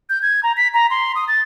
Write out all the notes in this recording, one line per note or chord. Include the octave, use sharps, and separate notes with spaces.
G6
G#6
A#5
B6
A#5
C6
D#6
A6